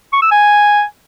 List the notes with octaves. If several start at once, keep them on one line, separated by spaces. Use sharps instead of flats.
C#6
E6
G#5